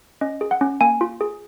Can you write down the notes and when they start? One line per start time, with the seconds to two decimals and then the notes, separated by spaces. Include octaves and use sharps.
0.21 C#4 D#5
0.41 G#4
0.51 F#5
0.61 C#4
0.81 A#3 G#5
1.01 F4
1.21 G#4